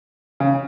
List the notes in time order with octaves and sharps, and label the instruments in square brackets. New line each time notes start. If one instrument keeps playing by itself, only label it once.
[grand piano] C#3